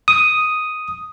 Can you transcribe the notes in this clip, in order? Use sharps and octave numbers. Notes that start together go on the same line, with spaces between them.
D#6